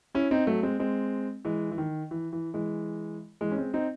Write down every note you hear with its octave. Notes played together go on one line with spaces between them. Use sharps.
C#4 E4
C4 D#4
F#3 A3
G#3 C4
G#3 C4
E3 G#3
E3
D#3
E3
E3
E3 G#3
E3 G#3
C#4
G#3 C4
C4 D#4